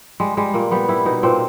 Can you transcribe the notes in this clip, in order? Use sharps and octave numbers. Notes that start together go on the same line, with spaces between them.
G3 G#3
G3 G#3
A#2 A#3
G3 B3
G3 E4
B2 D#4
A#2 C4